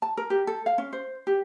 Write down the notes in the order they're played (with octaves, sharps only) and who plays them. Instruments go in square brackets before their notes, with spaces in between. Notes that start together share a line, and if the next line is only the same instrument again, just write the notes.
[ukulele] A5
A#4
G4
A4
F5
C#4
C5
G4